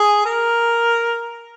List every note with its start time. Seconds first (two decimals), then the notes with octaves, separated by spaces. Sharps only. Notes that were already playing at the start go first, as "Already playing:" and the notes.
Already playing: G#4
0.25 A#4